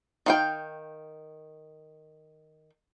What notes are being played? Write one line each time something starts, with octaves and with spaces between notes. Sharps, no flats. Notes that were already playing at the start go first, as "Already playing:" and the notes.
D#3 F5 G5